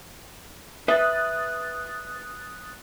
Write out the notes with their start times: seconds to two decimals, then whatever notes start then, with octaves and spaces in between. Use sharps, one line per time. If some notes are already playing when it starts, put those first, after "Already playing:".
0.88 B4 E5 D#6 F#6 A6